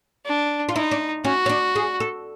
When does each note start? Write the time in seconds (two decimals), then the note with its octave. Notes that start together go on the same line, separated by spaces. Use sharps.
0.26 D4
0.69 F4
0.75 D#4 E4
0.91 D4
1.25 C#4 F#4
1.46 C#4
1.49 D4
1.76 G#4
2.00 A4